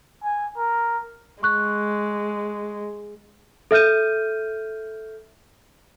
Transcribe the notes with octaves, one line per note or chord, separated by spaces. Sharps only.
G#5
A#4
G#3 C#6 F#6
A4 E5 F6 G6 D#7